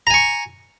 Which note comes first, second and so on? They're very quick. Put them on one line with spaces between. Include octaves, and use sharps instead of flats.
A#5 G#5 C#6